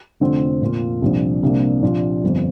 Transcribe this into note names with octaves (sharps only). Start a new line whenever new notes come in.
F1 F2 D3 F3 C4
A#2 A#3 F4
C2 A#2 F3 D4
C2 C3 A#3 D4
A#2 F3 D4 F4
G1 F2 F3